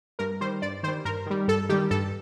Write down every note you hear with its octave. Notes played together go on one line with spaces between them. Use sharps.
G2 A#4
D#3 G3 C5
G2 D5
D#3 G3 C5
G2 A#4
D#3 G3
G2 A4
D#3 G3 G4
G2 A4